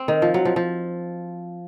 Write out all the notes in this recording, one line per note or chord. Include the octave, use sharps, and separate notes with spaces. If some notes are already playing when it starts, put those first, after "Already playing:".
Already playing: C4
D#3
F3
F#3
F3
F3